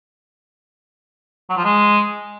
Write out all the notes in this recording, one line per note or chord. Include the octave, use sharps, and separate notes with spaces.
F#3
F3
G#3